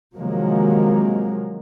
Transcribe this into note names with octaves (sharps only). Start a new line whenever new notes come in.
C3 D#3 F3 F#3 G#3 A#3